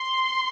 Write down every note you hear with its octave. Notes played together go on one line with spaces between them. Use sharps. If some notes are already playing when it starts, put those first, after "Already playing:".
Already playing: C6